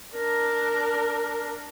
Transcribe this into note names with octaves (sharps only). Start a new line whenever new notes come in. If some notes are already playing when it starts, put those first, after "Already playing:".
D4 A#4